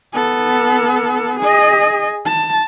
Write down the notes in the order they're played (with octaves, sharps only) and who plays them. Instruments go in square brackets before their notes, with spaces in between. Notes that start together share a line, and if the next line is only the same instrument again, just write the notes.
[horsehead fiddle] B3 A4
G#4 D#5
A5